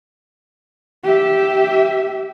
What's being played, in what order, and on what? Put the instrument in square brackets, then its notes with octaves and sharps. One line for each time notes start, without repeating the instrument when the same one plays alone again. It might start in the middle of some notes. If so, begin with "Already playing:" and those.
[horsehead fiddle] G4 E5